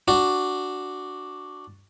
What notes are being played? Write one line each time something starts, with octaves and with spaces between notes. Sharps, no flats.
D4 F#4